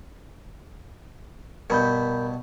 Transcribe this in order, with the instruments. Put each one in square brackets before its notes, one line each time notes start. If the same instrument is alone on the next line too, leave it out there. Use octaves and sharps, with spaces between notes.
[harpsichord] G2 B2 [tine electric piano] A#4 B5 G6